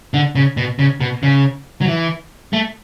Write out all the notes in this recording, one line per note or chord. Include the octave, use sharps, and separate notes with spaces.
D3
C#3
B2
C#3
B2
C#3
F#3
E3
A3